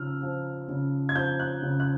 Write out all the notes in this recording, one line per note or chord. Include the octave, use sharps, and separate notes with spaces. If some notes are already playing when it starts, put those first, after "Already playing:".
Already playing: C#3 F3 E6 F6
F3
C#3
G#6
F3 G6
F#6
C#3
F#6